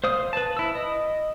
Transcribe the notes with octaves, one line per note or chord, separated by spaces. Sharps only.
C5 F5 D#6
B4 A5
E4 E6
D#5